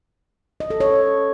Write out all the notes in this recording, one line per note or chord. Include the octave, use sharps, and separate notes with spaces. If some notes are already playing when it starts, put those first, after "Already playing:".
D#5
A4
C#5